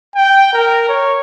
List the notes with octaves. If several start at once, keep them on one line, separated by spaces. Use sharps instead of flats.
G5
A#4
C#5